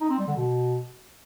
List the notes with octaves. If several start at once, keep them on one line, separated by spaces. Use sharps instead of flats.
D#4
C4
G3
D3
B2